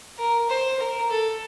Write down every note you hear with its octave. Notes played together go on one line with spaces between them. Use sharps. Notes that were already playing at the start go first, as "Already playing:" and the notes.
A#4
C5
A#4
A4